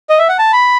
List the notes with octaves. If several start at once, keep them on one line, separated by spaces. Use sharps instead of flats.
D#5
E5
F#5
A5
B5